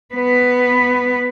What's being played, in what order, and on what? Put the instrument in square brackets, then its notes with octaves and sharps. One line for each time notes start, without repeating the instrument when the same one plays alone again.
[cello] B3 B4